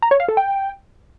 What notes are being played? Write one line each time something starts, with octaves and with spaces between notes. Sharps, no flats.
A#5
C#5
F5
A4
G5